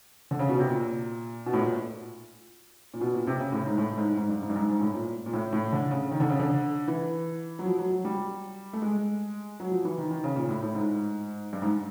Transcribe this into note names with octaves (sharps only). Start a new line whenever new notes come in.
D3
C#3
B2
C3
A#2
B2
A2
A#2
A#2
B2
A#2
C3
C#3
A2
G#2
A2
G#2
G#2
G2
G#2
G2
G#2
G#2
A2
A#2
A#2
A2
A2
D3
C#3
D#3
D3
C#3
D3
E3
F#3
F3
F#3
F#3
G3
A3
G#3
F#3
F3
E3
D#3
D#3
C#3
A#2
A2
A2
G#2
G2
G#2